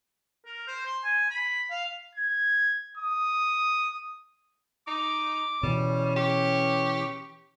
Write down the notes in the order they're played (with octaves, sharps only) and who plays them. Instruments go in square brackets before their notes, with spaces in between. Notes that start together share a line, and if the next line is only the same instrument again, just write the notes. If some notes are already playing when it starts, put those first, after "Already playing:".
[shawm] A#4
C5
C6
G#5
B5
F5
[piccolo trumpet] G#6
D#6
[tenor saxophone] D#4 [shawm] D6
[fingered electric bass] B2 E3 [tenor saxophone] G3 [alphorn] C#4
[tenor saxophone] G4 [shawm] C#6